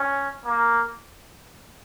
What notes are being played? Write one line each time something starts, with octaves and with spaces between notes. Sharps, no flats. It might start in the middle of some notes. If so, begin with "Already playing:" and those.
Already playing: C#4
A#3